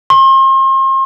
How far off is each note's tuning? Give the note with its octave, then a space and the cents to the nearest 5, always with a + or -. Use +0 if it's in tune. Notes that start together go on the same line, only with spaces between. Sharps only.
C6 +40